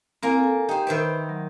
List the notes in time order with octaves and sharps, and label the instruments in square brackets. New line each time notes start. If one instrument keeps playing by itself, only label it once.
[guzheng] A#3 A#4 [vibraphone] C4 E4 G#5
[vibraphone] A4 G#5
[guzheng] D#4 C5 [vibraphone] G4 G5
[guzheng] D#3 E5 G5 [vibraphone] B4 C5 B5
[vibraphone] F#3